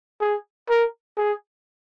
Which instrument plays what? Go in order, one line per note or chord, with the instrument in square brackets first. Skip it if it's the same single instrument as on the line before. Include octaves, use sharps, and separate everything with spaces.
[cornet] G#4
A#4
G#4